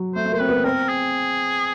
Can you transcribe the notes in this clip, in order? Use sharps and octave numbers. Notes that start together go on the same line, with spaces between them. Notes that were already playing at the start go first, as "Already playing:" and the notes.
Already playing: F#3
A3 C5
A3
A#3 C5
C4 B4
B3
C4 A#4
G#4